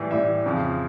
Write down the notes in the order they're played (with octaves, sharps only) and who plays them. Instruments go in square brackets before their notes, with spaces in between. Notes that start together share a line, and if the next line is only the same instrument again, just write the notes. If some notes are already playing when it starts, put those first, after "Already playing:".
Already playing: [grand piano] A2 E3 G3
A2 E3 G3 E5
F2 C#3 F3